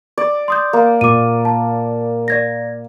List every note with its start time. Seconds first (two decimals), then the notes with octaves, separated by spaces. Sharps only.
0.18 D5
0.48 C6 D#6 G6
0.73 A#3
1.01 A#2 D6 D#7
1.45 A5
2.28 D5 G#6 A#6